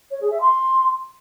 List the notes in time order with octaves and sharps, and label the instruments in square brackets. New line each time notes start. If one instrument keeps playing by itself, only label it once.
[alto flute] C#5
G#4
E5
C6